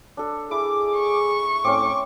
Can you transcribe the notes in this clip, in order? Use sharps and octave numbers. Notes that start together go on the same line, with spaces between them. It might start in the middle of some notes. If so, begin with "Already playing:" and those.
D4 A4
E4 G#4 D6
C#6
A2 C4 C#4 D6